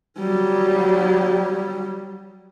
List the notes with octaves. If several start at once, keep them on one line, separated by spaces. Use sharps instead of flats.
F#3 G3